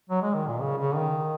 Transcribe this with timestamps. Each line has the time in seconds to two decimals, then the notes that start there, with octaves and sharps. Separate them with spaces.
0.10 F#3
0.22 G#3
0.34 D#3
0.48 A#2
0.60 C#3
0.77 C#3
0.95 D#3